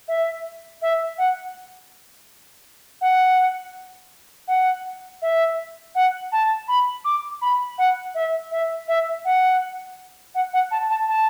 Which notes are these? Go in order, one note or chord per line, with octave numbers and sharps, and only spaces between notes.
E5
E5
F#5
F#5
F#5
E5
F#5
A5
B5
D6
B5
F#5
E5
E5
E5
F#5
F#5
F#5
A5
A5
A5